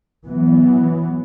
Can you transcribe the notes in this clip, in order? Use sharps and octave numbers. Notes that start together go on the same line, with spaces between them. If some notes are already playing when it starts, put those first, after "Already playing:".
E3 F#3 B3